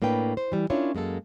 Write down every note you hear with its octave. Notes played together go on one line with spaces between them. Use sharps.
A2 A#3 D4 B4 G5
C5
E3 G3
C#4 D4 E4 F4 A#4 C#5
F#2 G#3 A#3 A4